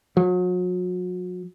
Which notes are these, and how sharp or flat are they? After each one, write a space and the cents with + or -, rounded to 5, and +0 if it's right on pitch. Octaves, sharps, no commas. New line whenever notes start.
F#3 -40